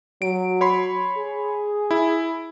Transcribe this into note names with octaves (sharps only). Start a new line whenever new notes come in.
F#3 D7
C#5 B5 C6
G#4
E4